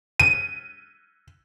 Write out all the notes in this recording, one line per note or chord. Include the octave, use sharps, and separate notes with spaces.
D#7